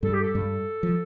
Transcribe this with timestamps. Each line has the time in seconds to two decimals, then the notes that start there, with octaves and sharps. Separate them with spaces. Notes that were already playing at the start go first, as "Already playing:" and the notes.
0.03 G2 G3 A4
0.13 G4
0.22 A4
0.35 G2 G3
0.83 F3